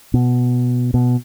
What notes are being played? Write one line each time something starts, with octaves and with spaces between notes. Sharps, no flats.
B2
B2